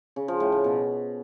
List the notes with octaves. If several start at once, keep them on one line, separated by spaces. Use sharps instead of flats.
C#3
F3
A2
A2
B2